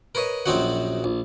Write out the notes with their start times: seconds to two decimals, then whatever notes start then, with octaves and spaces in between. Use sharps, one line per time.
0.15 A#4 B4 C#5 D#5
0.46 A#1 F#2 C4 D#4 F#4 F#5
1.04 A#1